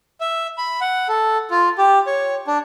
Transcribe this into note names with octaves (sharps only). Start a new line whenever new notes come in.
E5
B5
F#5
A4
F4
G4
C#5
D4